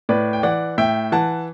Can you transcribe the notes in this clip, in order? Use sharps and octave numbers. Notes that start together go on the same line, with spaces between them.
A2 B4 D5
G5
E3 D5 F#5
A2 E5 G5
E3 F#5 A5